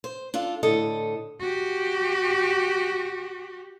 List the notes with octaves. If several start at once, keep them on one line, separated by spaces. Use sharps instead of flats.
C5
D4 F4 A4
A2 D3 A4 D#5
F#4 G4